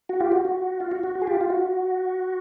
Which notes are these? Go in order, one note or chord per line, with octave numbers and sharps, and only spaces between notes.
F#4
F4 G4
F#4
F#4
F4
F#4
F#4
F#4
G#4
F4 G4
F4
F#4